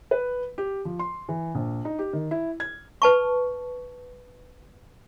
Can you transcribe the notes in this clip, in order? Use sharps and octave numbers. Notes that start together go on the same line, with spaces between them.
B4
G4
F3
C6
E3
A#1
D#4
G4
D#3
E4
G#6
B4 A5 C#6